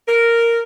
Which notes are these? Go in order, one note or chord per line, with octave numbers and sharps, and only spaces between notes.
A#4